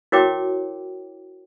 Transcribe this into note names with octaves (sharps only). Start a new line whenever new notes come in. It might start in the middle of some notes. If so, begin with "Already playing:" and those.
E4 F#4 A#4 C#5 G5 D6